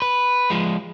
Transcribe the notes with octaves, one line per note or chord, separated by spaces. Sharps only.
B4
F3 G#3